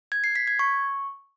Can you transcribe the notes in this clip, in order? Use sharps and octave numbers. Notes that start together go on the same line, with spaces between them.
G#6
C7
B6
G#6
C#6